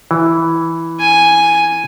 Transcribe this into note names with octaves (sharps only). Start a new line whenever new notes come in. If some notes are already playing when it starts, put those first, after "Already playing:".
E3
G#5